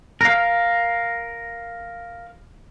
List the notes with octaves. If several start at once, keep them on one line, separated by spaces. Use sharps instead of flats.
A#4 F5